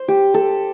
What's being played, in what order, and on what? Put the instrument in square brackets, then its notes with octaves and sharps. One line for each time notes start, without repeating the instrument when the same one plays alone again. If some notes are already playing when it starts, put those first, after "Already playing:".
Already playing: [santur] C5
G4
A4